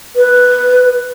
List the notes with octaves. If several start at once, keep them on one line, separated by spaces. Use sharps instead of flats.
B4